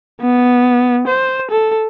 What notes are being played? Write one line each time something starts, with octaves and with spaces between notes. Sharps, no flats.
B3
C5
A4